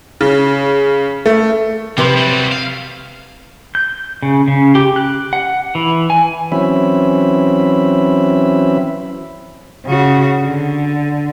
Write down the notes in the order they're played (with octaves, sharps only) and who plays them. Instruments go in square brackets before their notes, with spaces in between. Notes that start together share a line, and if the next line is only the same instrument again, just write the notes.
[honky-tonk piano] C#3
A3
[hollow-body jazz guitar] C3 B4 C6 [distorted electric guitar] F3
[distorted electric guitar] F#3 G3
F5
[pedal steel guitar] G6
C#3
C#3
G4
F#6
F#5
E3
G#5
[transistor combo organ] E3 F#3 C4 C#4 E5 B5
[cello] C#3 F#4
D3